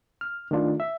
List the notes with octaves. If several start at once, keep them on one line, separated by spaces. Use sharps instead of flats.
F6
D#3 A3 D4 F4
E5